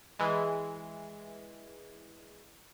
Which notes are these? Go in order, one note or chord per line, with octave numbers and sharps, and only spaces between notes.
E3 G#3